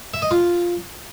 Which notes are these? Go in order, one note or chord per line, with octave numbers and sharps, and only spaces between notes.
E5
D#5
F4